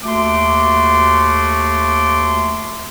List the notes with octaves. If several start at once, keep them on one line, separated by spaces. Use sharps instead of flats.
D#2 A3 F#4 C6 D6